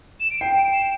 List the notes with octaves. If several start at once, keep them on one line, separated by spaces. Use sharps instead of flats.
E7
D7
G5 C7
D7
E7